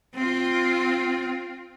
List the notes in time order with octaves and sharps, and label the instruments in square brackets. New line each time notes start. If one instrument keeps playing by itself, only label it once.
[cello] C4 F4